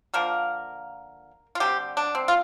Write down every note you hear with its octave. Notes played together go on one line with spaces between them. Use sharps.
D3 F3 A#3 A#4
F4
D3 G3 C4 G4
D4
C4
F4